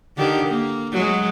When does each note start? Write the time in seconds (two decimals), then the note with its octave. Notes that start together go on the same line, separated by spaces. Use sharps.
0.17 D3 D#3 G4
0.48 A#3
0.92 F#3 G#3